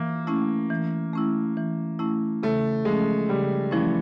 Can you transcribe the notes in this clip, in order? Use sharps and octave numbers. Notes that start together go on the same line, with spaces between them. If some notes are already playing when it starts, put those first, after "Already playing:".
Already playing: E3 A#3
A3 C#4 E4
E3
A3 C#4 E4
E3
A3 C#4 E4
C#3 A3
F3 G#3 A3 C#4
C#3 G3
E3 F3 A3 C#4